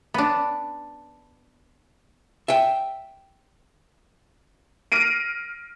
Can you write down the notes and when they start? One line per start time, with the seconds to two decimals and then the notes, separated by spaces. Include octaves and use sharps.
0.14 B3 D4
2.48 E5 G5
4.92 F6 A#6 C7 D7 D#7